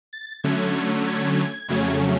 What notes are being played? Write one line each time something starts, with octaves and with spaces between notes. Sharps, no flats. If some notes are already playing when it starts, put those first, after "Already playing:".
A6
D3 F#3 A3 C#4 G#6
G#6
F2 C#3 F#3 A3 C#4